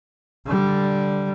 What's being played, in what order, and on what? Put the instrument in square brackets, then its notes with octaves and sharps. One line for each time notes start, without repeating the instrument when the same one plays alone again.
[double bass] D3 G3